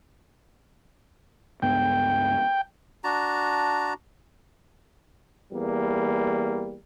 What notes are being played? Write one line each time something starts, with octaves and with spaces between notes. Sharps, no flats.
C#2 G2 B3 G5
D4 F#4 A5 A#5
E2 G3 A#3